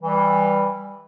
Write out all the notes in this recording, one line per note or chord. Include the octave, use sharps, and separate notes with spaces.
E3 G3